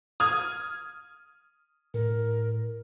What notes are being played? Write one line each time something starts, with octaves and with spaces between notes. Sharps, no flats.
D#6 F6 G#6
A2 A#4